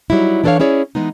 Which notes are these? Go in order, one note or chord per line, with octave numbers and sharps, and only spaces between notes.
F#3 G3 D#4 E4
E3 D4 A4 C5 C#5 F5
C#4 E4 G#4 C#5 D5
E3 G#3 B3 D#4